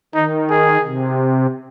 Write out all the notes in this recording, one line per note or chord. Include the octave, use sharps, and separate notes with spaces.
D#3 D#4
G#4
C3